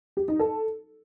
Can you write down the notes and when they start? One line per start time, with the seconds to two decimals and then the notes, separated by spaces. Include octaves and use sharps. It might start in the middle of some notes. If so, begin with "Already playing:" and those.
0.17 G4
0.28 D#4
0.39 A4